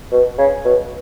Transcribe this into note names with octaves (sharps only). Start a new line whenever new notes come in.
B2
C#3
B2